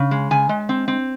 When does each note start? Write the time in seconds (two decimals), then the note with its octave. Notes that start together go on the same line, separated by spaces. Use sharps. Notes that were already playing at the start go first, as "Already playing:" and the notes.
Already playing: C#3
0.11 G#3
0.31 C#3 G#5
0.49 G#3
0.69 C4
0.88 C4